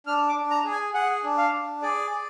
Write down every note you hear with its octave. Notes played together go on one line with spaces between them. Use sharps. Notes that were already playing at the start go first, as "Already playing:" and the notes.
D4 F6
D6
D4
A#5
G#4
G#5
G#4 F#5
D4
F5
D4
G#4 D5
G#4